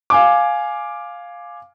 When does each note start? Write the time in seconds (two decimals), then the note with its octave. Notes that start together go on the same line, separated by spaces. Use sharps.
0.10 F5 G#5 D6